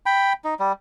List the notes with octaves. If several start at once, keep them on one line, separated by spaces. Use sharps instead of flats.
G5 B5
D#4
G3